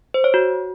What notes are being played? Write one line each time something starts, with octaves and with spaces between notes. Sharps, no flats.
C5
C#5
F#4